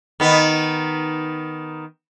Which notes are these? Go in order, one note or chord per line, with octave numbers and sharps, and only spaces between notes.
D#3 B3